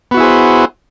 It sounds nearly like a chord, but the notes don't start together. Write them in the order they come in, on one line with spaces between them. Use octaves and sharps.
B3 F#4 E4 G#4 C5